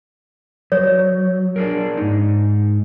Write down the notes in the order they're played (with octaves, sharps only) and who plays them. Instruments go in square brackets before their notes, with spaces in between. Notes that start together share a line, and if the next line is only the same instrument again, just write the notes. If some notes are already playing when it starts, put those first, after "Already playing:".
[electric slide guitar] F#3 [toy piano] C#5
[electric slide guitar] D4 G#4 A#4
G#2 D#4